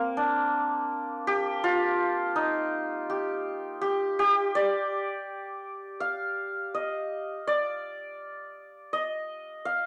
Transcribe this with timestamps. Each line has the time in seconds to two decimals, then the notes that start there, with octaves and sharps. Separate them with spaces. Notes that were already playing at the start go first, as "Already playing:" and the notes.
Already playing: A#3 C4
0.17 D4
1.27 G4
1.64 F4
2.36 D#4
3.10 G4
3.81 G4
4.19 G4
4.55 D5
6.00 F5
6.74 D#5
7.47 D5
8.93 D#5
9.65 F5